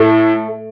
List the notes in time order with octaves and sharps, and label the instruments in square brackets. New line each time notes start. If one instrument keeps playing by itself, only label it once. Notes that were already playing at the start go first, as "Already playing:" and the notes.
Already playing: [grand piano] A2 [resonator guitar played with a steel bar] A3